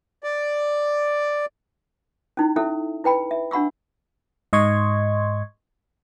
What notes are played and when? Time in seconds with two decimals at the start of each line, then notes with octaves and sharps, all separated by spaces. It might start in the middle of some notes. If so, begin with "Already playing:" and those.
0.24 D5
2.37 C#4 D#4 E4
2.56 C#4 E4 A4 E5
3.04 E4 B4 G5 B5
3.31 E5
3.51 D4 F#5 B5 C#6 E6
4.53 G#2 D#5 C6 C#6 G#6